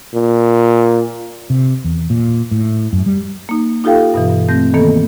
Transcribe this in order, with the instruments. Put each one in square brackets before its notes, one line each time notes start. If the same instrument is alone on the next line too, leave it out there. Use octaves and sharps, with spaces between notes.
[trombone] A#2
[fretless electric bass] C3
E2
A#2
A2
F#2
G3
[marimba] A#3 D#4
D#4 F4 G4 A4 F5 G5
G2 B2 E3
A3 C4 G6 A#6
D#3 E3 A#3 B3 A4